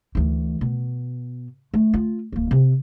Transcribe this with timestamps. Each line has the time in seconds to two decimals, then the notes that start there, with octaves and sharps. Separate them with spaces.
0.15 D2 E3
0.61 B2
1.74 A3
1.94 F4
2.32 D1 A#3
2.51 C3